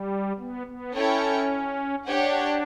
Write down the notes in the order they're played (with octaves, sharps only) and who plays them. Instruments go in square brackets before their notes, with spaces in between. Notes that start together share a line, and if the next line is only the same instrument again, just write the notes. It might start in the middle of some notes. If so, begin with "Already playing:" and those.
Already playing: [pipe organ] G3
B3
B3
[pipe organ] C#4 [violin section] E4 A4 C#5 G5
[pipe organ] D4 [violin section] G4 C#5 F#5